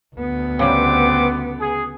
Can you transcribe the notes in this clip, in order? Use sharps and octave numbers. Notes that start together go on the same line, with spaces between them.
D2 B3
C#3 G3 C4 F#5 D6
G#4